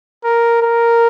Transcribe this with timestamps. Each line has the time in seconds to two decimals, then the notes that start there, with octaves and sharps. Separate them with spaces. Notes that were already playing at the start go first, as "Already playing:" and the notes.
0.24 A#4
0.62 A#4